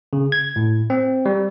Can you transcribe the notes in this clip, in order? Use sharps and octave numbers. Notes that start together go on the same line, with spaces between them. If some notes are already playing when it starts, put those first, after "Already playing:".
C#3
G#6
A2
C4
G3